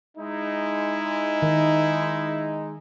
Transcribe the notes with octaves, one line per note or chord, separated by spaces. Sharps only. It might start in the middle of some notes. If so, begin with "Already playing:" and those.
G#3 D#4 E4
D#3